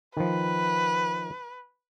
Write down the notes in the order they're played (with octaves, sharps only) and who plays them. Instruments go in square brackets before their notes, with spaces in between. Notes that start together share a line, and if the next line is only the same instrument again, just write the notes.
[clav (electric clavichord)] D#3 F3 [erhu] B4